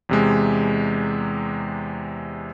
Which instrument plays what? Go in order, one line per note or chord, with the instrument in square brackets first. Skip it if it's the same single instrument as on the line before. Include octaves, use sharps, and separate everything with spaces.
[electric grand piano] E2 C3 G#3